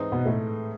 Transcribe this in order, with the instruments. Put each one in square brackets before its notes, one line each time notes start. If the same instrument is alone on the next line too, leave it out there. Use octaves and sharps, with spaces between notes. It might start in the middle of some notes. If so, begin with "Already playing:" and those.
Already playing: [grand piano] G#2 E3 G#3 C4 D#4
[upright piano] B2 B3
A2 A3